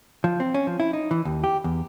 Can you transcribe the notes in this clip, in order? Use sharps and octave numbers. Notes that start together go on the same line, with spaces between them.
F3
C4
C#4
F3
E4
D#4
E3
D#2
G4
E2